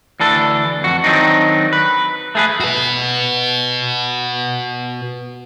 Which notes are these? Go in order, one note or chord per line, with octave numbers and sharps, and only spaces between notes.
D2 E3 D4 A4
F2 F#4
D#3 F#3 C4 D4 D#4
B4
A3 G#4 B4
F#4 B4